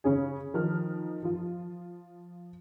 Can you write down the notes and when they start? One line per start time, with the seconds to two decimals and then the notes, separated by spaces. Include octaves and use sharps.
0.04 C#3 C#4 G#4
0.54 D#3 F3 F6
1.23 F3 F4